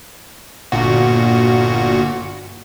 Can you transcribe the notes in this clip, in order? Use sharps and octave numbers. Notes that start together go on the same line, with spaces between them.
G1 A#2 F#4